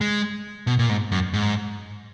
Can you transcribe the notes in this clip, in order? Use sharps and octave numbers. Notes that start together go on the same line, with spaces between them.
G#3
B2
A#2
G#2
F#2
G#2